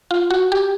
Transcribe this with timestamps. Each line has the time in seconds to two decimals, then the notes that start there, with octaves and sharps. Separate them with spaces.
0.11 F4
0.30 F#4
0.52 G4